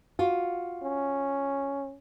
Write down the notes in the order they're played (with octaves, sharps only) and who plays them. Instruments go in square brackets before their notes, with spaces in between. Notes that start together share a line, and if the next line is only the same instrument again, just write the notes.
[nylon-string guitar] F4 F#4
[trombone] C#4